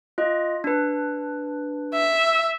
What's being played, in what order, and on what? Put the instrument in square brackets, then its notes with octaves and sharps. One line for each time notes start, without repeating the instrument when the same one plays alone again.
[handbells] F4 D#5
D4 B4
[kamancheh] E5